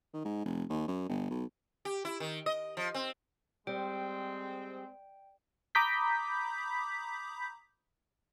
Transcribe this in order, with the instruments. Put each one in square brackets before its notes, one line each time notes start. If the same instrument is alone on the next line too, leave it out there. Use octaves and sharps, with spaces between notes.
[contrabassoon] D#3
G#2
F1
D#2
F#2
G1
B1
[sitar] G4
E4
D#3
D#5
F3
C4
[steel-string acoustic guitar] G3 [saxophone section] G#3 C4 [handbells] G5
[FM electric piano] A#5 B5 D6 D#6 G6 B6